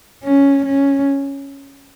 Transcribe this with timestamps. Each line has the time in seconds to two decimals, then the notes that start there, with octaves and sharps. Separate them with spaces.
0.23 C#4
0.65 C#4